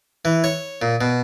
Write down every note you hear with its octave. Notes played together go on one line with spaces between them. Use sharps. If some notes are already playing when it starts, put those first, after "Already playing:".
E3
C#5
A#2
B2